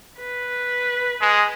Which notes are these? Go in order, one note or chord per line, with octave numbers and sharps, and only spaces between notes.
B4
G#3